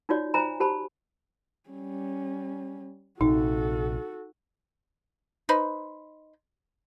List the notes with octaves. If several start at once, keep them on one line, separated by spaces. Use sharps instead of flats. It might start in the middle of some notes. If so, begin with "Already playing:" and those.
D#4 F4 F#4 C#5 D5
C5 E5 G#5 A#5 B5
F#4 G4 C5 A5 B5
G3 C#4
A#1 C3 D#4 F#4 A4
D#4 B4 C5